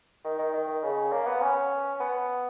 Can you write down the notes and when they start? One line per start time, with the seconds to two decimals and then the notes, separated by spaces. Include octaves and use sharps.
0.25 D#3
0.39 D#3
0.53 D#3
0.68 D#3
0.83 C#3
1.12 A#3
1.27 B3
1.42 C#4
2.00 B3